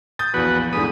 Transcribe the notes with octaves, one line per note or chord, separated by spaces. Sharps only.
D#6 G6 A6
A#1 E2 F#4 B4
E2 G#2 D3 B5 D#6